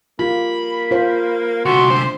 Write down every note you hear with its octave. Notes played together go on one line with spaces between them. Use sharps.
A#3 F4 G4 B5
F4 C5
D2 C3 F#4 C6
D4 C5